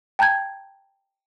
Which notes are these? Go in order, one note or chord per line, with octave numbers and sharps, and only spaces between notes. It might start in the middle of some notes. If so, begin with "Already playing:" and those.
G5 A5 A#5 G6 G#6